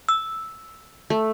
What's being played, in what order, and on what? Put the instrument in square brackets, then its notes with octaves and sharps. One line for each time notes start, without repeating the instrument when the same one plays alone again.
[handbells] E6
[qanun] A3